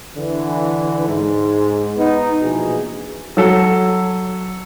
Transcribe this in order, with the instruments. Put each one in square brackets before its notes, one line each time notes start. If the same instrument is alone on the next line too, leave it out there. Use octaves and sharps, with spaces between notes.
[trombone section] D3 E3
G#2
B3 D#4
A#1 B2 E3 G#4
[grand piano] F#3 A4